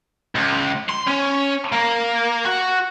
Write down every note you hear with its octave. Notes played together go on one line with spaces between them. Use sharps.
C#2
C6
C#4
A#3
F#4